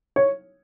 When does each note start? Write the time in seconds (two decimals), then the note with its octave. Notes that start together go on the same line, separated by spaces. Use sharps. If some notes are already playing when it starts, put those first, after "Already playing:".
0.16 C#5